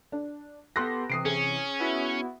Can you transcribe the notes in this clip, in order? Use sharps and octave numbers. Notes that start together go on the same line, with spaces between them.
D4
B3 G4 A4 C6 F#6 A#6
C3 E3 D#6 C7 D7
C#4 G#4
B3 E4 F#4